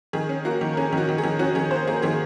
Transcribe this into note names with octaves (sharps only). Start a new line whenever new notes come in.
D#3 G#4
C#4
A#3 F#4
D#3
A#4
C#4 G#4
D#3
F#4
D#3
G#4
D#3
C#4 F#4
D#3 G#4
A#3 C5
A#3 G#4
D#3 G#4